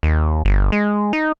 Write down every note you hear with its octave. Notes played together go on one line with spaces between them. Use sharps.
D#2
G1
G#3
D#4